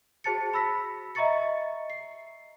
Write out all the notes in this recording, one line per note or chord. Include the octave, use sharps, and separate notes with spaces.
F#4 G#4 C5 A5 A6 C#7
B5 E6 A#6 B6
D#5 E5 A#5 C#6 A6 C#7
C7